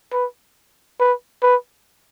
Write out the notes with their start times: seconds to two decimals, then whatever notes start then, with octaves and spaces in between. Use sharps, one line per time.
0.12 B4
1.00 B4
1.42 B4